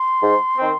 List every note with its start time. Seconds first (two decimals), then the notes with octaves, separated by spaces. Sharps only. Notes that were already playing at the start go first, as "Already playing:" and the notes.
Already playing: C6
0.21 G#2
0.57 D#3 C4